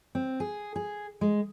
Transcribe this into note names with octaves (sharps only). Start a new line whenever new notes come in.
C4
G#4
G#4
G#3